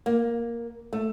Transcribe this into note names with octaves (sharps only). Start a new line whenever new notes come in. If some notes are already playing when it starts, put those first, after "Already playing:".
A#3
A3